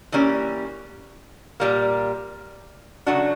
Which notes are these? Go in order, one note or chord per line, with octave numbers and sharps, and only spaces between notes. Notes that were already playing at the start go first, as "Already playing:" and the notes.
E3 G3 A#3 C#4
A#2 G3 A#3
C#3 F#3 A3 D4 F#4